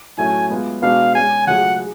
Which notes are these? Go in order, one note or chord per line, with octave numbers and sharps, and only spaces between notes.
A2 F#3 A3 C#4 G#5
G#3 B3 F4
B2 G#3 B3 D4 F#4 F5
G#3 C#4 G#4 G#5
C#3 F#3 A3 F4 G#4 F#5
G#4